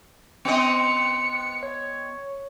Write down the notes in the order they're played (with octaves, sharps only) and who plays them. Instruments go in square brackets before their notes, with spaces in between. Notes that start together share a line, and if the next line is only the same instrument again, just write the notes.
[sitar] B3 C4 D#5 [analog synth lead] C#7
[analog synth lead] C#5